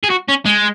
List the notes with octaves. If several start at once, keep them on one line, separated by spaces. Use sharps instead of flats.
G#4
F#4
C#4
G#3